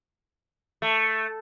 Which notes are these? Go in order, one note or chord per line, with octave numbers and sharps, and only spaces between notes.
A3